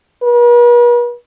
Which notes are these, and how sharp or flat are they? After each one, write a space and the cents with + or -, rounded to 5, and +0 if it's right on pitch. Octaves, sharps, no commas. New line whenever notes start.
B4 -45